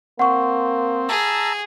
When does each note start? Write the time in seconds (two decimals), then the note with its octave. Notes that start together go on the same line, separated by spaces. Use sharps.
0.19 A#3 C4 F#5 C#6
1.09 G#4 A5 A#5 E6